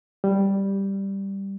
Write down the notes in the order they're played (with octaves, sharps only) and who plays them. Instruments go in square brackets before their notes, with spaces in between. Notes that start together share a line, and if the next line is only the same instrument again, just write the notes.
[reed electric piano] G3